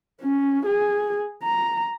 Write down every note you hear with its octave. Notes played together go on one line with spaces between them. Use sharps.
C#4
G#4
A#5